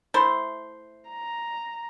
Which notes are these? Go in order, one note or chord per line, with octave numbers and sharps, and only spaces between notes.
A3 E4 C5
A#5